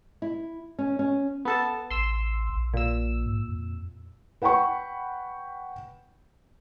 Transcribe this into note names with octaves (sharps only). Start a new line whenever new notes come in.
E4
C#4
C#4
B3 A4 A5
A1 C6 E6
A#1
A#2 E6
G#2
F2
B4 F#5 G5 B5 C#6